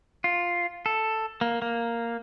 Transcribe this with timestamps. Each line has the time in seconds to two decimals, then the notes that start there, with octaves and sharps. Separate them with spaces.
0.24 F4
0.86 A4
1.41 A#3
1.62 A#3